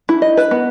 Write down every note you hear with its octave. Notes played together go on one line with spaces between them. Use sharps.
E4
D#5
B4
B3